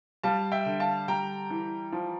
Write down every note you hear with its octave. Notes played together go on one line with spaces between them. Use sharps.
G3 F5 A5
E5 G5
D3
F5 A5
G3 G5 A#5
E3
F3